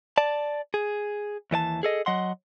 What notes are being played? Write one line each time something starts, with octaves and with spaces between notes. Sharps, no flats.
D5 A5
G#4
D#2 E3 D5 A5
G#4 A4 D#5
F#3 D#5 F#5 C6